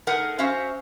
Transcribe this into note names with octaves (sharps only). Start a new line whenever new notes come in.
A3 D#4 G#4 A#4 F#5
C#4 F#4 C5 E5 F5